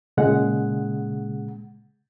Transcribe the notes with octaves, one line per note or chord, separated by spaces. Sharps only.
A#2 C#3 G#3 F#5